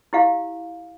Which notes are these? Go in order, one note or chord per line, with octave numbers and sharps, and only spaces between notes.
E4 G4 F5